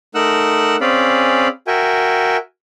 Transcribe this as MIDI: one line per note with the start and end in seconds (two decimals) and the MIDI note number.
0.15 0.76 57
0.15 0.76 63
0.15 0.76 70
0.15 0.76 78
0.15 0.76 88
0.15 0.76 90
0.81 1.48 60
0.81 1.48 61
0.81 1.48 68
0.81 1.48 74
0.81 1.48 77
0.81 1.48 83
1.67 2.37 66
1.67 2.37 70
1.67 2.37 76
1.67 2.37 79
1.67 2.37 80